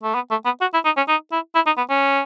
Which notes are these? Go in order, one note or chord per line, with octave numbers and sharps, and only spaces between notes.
A3
B3
A3
B3
F#4
E4
D#4
C#4
D#4
E4
E4
D#4
B3
C#4